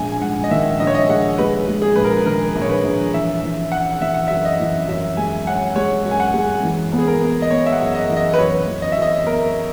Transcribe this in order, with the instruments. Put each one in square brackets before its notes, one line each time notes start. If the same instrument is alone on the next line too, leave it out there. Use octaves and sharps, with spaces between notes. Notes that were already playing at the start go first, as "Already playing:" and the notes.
Already playing: [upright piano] A#1 G#3 [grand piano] G#5
[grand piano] G#5
[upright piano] G#2 [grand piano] F#5
[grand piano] D#5
[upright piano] D#3 [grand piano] E5
[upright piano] A#1 [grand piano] D#5
[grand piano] C#5
D#5
[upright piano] G#3 [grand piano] F#5
[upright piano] G#3 [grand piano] B4
[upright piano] G#3
[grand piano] G#4
[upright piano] A#1 [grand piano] B4
[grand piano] A#4
[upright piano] D#3 [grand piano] A#4
[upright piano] A#1
[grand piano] C#5
B4
[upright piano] A#1
[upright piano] E3 [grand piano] E5
[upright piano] E3
[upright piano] C#4 [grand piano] F#5
[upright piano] E3 [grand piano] E5
[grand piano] F#5
[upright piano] F#2 [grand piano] E5
[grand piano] D#5
[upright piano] E3
[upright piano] F#2 [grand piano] E5
[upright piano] G#3 [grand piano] G#5
[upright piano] C#4 [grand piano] F#5
[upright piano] G#3 [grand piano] C#5
[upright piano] F#2
[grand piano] G#5
F#5
[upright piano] G#3
E3
B3
[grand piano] G#4
A#4
[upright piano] B3
[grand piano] D#5
[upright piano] B3 [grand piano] C#5
[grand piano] E5
F#5
[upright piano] F#2
[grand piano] D#5
[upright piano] E3
[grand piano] D#5
B4
[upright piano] F#2 [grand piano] C#5
[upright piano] E3
[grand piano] D#5
[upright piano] F#2 [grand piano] E5
[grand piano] D#5
[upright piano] B3 [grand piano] A#4